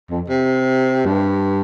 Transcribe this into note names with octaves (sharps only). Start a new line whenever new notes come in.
F2
C3
G2